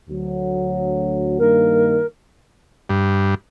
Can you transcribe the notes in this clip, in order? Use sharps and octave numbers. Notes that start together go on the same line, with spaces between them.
D2 F#3
G2 D#3 A#3 A#4
G2